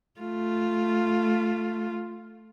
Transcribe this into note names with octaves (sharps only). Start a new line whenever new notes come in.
A3 F4